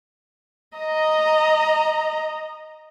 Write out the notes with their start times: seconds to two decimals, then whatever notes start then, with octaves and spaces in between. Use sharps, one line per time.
0.77 D#5 A#5